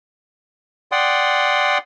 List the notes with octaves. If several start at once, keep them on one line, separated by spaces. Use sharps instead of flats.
D5 F#5 G5 C6 D#6